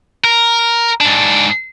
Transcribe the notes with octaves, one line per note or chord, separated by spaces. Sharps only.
A#4
G#2 D4